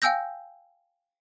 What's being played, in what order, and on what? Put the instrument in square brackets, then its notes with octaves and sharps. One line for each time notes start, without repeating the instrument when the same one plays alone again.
[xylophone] F5 G5 G#5 E6 G6 A#6